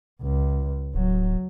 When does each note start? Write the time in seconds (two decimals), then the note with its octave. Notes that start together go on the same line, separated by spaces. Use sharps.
0.22 C#2
0.95 D1 F#3